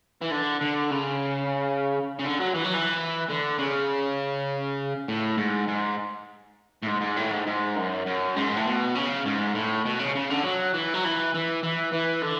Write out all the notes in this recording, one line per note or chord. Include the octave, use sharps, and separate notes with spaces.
E3
D3
D3
C#3
C#3
D3
F#3
E3
F#3
E3
D3
C#3
A2
G#2
G#2
A2
G#2
G#2
A2
G#2
G#2
F#2
F#2
G#2
A2
B2
C#3
G#2
A2
B2
C#3
C#3
D3
F#3
E3
F#3
E3
E3
E3
E3
D3